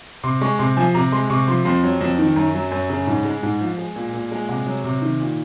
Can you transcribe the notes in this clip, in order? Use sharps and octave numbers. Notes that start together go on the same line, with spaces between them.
C3 C6
G#3 C#6
C3 C6
F3 G#5
C3 A#5
G#3 C6
C3 C#6
F3 C6
F2 C6
F#3
F2
D#3
F#2 A#5
F#3
F#2
C#3
G#2
G#3
G#2
F3
G#3
A#2
A#2
G#3
C3 F#5
F#3
C3
D#3
A#2